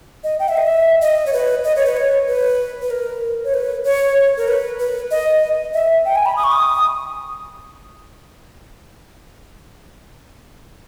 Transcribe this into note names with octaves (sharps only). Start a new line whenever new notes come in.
D#5
G5
E5
D#5
E5
D#5
C#5
B4
D#5
C#5
B4
C#5
B4
B4
A#4
C#5
B4
C#5
A#4
B4
B4
D#5
E5
G5
G#5
B5
D#6
C#6
D#6